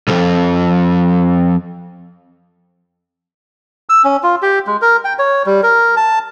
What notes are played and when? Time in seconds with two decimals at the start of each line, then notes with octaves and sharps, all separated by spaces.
0.08 C2 F2
3.89 E6
4.04 C#4
4.23 F4
4.42 G4
4.67 G#3
4.82 A#4
5.05 G5
5.19 C#5
5.46 G3
5.63 A#4
5.97 A5